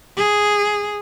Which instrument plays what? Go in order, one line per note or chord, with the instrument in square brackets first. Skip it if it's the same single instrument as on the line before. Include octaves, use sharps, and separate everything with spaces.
[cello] G#4